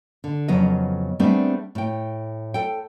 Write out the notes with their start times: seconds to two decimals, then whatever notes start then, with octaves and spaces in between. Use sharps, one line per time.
0.24 D3
0.48 F2 C#3 F#3 B3 D#5
1.19 G3 A3 B3 C4 D4 G#4
1.75 A2 G5
2.54 A4 G5